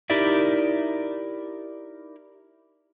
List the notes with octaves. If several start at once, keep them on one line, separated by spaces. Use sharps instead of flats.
D#4 E4 G4 A#4 D5 E5